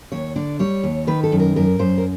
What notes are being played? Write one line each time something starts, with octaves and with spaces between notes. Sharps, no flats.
D#2 C#5
D3 D5
G3 C#5
D#2
D#3 B4
A4
F#2
A#4
F#2 A#4
F#2 C5
A#4